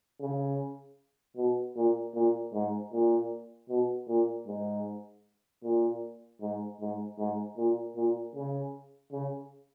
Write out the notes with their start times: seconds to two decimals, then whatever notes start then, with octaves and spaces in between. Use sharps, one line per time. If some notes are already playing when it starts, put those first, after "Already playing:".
0.21 C#3
1.37 B2
1.76 A#2
2.15 A#2
2.54 G#2
2.93 A#2
3.69 B2
4.08 A#2
4.48 G#2
5.64 A#2
6.41 G#2
6.81 G#2
7.18 G#2
7.57 A#2
7.96 A#2
8.36 C#3
9.13 C#3